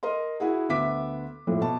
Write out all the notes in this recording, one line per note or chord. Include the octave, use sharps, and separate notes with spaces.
A#4 D#5 C6
E4 F#4 G#4
D2 B3 E5 D6 B6
F2 A2 F3
B2 A5